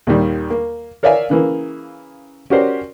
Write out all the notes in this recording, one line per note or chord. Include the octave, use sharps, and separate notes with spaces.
D#2 A#2 D#3 G3
A#3
A#4 C#5 D5 E5 F5 G#5
C#3 E3 A#3
C#4 F#4 G4 A#4 C5 D5